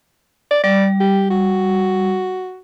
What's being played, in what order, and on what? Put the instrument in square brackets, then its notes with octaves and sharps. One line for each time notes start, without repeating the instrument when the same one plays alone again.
[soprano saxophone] D5
[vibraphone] G3 [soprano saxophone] D5
[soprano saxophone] G4
F#4